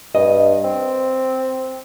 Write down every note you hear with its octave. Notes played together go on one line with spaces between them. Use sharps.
G2 D#5
C4